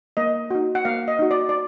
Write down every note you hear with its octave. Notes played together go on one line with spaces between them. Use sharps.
A#3 D#5
D#4 F#4
F#5
A#3 F5
D#5
D#4 F#4
D5
D5